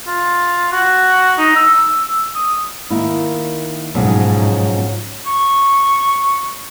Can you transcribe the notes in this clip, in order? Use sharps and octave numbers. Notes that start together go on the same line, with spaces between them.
F4
F#4
D#4
E6
D#6
D#3 A#3 E4
B1 G#2 C#3 F3 F#3
C#6